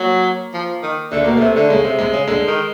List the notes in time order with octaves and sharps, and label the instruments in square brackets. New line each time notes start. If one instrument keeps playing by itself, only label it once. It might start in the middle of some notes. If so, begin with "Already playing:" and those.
Already playing: [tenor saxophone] F#3 [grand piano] A#3
[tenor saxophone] F3
D#3
[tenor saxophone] D3 [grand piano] A3
[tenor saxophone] B2 [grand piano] A#3
[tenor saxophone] C3 [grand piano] A3
[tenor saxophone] D3
[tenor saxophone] C#3 [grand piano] G#3
[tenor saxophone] C3
[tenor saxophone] C3 [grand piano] G#3
[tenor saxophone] C#3
[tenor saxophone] D3 [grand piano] G#3
[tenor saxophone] D#3